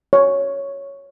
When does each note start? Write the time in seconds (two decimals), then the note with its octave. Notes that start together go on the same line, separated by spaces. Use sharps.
0.13 C#5